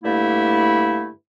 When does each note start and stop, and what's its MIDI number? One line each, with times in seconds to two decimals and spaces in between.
0.03 1.08 43
0.03 1.08 50
0.03 1.08 57
0.03 1.08 58
0.03 1.08 64